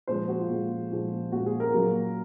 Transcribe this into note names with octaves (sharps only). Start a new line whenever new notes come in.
A#2 F3 G#3 C5
F#4
F4
A#2 F3 G#3
A#2 F3 G#3
A#2 F3 G#3 F#4
G#4
A#4
A#2 F#3 A#3